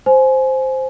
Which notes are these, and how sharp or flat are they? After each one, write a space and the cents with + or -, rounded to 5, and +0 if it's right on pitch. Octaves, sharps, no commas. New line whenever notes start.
C5 +0 G#5 +20